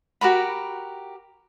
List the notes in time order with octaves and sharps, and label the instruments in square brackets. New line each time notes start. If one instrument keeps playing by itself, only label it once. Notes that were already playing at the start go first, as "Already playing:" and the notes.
[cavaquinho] F#4 G4 A#4 B5